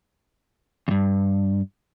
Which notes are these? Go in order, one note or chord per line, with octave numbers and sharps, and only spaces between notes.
E2 G2